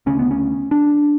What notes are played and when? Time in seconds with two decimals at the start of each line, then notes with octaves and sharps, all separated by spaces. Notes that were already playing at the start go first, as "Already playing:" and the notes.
0.06 D2 C#3 C#4
0.19 B3
0.31 C#4
0.71 D4